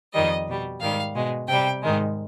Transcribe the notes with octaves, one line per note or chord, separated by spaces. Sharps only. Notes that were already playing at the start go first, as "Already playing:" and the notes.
F2 D#3 G3 D#5
B2 G3
G#2 D#3 G3 F5
B2 G#3
C3 G3 G5
G#2 D#3 G#3